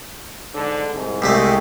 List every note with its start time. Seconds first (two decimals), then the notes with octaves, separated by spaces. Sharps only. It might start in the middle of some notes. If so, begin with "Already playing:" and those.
0.54 G#2 D3
0.93 C2 G#2
1.22 C2 C3 G#3 A3